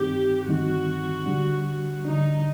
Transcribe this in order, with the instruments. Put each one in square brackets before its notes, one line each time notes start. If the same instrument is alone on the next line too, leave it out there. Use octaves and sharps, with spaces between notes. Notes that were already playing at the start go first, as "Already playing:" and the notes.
Already playing: [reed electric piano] G2 D#3 G3 C4 D#4 [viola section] G4
[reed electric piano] G2 D#3 G3 C4 D#4 [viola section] F#4
[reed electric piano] D3 G3 D4
[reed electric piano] D3 G3 D4 [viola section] D#4